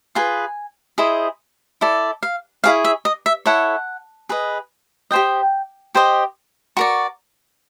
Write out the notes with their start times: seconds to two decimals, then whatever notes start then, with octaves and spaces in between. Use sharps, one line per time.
0.15 F4 G#4 B4 G#5
0.98 E4 G#4 C5 D#5
1.81 E4 A4 D5
2.23 F5
2.64 E4 G#4 C#5 F5
2.84 E5
3.05 D#5
3.26 E5
3.46 E4 A4 C#5 F#5
4.29 G#4 B4 D#5
5.11 G4 C5 D#5 G5
5.95 G4 C5 D#5
6.77 F#4 A#4 D5 C#6